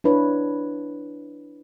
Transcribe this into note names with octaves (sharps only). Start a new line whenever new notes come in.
D4 E4 B4 C#5